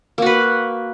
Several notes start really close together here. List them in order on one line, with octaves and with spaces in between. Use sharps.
A#3 F#4 B4